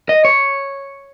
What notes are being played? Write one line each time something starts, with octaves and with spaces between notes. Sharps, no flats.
D#5
C#5